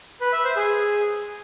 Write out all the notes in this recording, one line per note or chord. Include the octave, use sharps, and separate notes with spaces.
B4
E5
C5
G#4